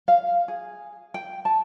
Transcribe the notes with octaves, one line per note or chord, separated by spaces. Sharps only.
F5
G#4
G5
A5